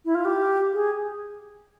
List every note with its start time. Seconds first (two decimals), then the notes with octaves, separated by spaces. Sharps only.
0.05 E4
0.15 F4
0.25 G4
0.73 G#4